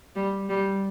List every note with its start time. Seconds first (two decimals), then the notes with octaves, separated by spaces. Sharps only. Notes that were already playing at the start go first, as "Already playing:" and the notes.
0.16 G3
0.49 G3